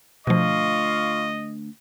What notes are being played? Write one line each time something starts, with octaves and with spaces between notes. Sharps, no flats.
D2 B2 F3 F4 D#5 F5 C#6